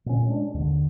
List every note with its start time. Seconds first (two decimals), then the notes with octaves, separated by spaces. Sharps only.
0.06 A#2 C#4
0.27 G#3 D4
0.54 D#2 D3